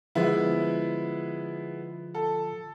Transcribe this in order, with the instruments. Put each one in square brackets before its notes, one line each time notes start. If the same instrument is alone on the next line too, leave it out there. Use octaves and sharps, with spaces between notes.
[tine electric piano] D3 F3 F4 [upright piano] G#3 B3 E4
[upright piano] A4